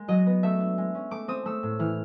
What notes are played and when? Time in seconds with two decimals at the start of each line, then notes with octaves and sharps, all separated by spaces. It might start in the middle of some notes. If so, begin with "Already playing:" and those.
Already playing: G#3 A#3
0.08 F#3 D#5
0.26 B3
0.43 A3 E5
0.60 D4
0.78 G#3
0.95 C#4
1.11 A3 D6
1.28 C4 D#6
1.45 A3 E6
1.63 A2
1.79 E3 F6